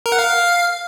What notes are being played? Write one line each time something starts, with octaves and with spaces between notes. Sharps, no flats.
A#4
F#5
F5